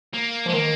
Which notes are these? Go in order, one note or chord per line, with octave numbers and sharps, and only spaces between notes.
A#3
F3 G#3
D#3 A#3